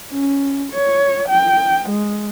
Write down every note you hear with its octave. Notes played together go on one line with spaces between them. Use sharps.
C#4
C#5
G5
G#3